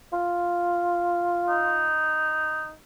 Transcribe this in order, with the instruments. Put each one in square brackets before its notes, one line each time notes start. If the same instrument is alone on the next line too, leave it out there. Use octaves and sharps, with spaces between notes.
[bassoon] F4
[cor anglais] D#4